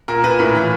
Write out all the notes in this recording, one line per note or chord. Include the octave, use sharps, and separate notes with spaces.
A#2 A#4
A#2 B4
A2 A#4
E3